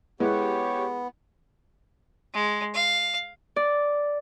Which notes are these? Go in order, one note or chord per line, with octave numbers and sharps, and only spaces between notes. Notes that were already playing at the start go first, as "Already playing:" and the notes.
G#3 B3 E4 G4 B4 C#5
G#3
F5
D5